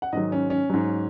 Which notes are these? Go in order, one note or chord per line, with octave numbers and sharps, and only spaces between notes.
F#5
G#2 D#3 F#3 D#5
C#4
C#4
G#2 F#3